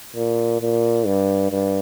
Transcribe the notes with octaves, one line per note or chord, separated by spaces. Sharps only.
A#2
A#2
G2
G2